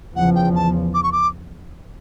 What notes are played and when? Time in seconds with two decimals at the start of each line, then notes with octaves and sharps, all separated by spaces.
0.16 E2 C#3 F3 F#5
0.35 G5
0.55 A5
0.94 D6
1.03 C#6
1.12 D6